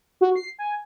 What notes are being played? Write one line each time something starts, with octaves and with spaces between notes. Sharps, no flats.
F#4
C7
G#5